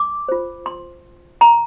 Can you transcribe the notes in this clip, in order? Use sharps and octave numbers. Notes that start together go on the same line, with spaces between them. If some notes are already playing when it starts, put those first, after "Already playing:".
Already playing: D6
F4 C5
C6
A#5